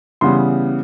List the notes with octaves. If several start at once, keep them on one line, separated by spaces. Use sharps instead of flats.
C#3 E3 G3 B3 C6